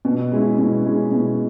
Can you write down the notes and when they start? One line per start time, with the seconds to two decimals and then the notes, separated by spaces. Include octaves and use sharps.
0.05 B2
0.32 G#3 C#4 E4
0.58 B2
0.84 G#3 C#4 E4
1.11 B2